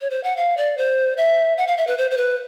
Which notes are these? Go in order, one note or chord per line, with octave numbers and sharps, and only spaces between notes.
C#5
C5
F#5
F5
D5
C5
E5
F#5
F5
E5
B4
C5
C5
B4